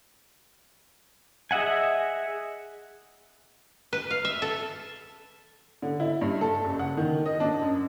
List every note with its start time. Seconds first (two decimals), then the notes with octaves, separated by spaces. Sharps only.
1.51 G#4 D#5 E5 F#5 G#5
3.93 B4
4.11 F5
4.25 E5
4.42 A4
5.82 D3
6.00 E4
6.21 G2
6.41 A4
6.64 F#1
6.79 F#5
6.97 D#3
7.26 D#5
7.40 D4
7.62 F#2